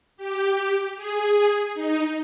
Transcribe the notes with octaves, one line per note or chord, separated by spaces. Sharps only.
G4
G#4
D#4